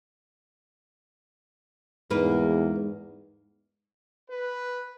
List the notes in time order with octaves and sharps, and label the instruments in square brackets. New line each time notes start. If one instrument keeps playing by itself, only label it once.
[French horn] E2 [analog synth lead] G#2 [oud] A#3 B4
[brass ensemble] B4